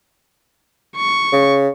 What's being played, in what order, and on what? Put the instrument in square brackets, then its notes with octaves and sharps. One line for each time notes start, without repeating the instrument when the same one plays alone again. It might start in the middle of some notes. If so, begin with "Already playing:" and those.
[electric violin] C#6
[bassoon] C#3